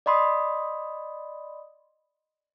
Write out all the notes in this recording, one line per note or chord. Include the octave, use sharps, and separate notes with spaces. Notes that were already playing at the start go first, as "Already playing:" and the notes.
D5 D#5 B5 C6 D#6